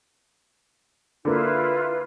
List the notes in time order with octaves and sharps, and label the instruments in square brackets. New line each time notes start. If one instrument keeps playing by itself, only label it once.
[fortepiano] D3 A#3 [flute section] E4 F4 B4